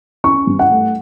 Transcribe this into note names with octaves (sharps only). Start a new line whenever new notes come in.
C#4 C#6
G2
F#5
A3